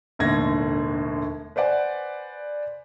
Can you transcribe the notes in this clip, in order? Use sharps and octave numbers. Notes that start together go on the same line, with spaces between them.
E1 D#2 A2 D3 G#6 A#6
B4 C5 D5 F#5 G#5